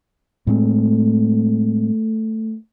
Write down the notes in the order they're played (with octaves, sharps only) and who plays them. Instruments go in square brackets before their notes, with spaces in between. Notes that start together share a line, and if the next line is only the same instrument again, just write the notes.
[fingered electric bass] A2 G#3 C4 [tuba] A3